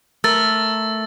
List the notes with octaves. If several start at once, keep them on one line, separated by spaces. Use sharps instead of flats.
A3 A#4 E6 A6